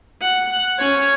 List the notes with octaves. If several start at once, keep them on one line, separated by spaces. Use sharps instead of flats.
F#5
C#4 C#5